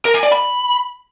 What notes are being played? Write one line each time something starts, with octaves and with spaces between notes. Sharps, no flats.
A#4
G#5
D5
B5